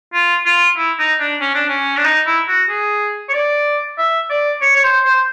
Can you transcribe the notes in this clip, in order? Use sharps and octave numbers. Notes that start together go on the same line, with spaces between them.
F4
F4
E4
D#4
D4
C#4
D4
C#4
D4
D#4
E4
F#4
G#4
C#5
D5
E5
D5
C#5
C#5
C5
C5